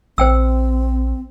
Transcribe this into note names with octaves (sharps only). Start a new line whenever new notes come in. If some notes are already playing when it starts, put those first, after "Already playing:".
A#1 C4 C5 G5 E6